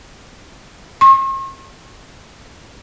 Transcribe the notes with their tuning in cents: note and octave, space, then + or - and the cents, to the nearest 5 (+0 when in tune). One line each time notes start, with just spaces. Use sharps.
C#6 -45